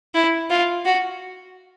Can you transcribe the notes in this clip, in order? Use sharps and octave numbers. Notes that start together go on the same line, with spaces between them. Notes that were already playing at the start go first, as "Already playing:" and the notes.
E4
F4
F#4